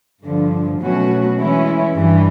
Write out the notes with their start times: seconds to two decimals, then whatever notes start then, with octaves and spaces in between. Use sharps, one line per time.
0.23 G2 D3 F3
0.80 B2 F#3 A3 C#4 F#4
1.38 E3 G#3 C#4 E4
1.95 G2 E3 G3